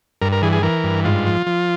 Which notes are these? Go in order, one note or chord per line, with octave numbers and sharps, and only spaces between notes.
G2 A#4
A#4
E3 G#4
G#4
E3 A#4
G2
G#2 F4
F3
F3